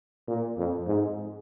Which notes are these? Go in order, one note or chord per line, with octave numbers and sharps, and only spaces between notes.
A#2
F2
G#2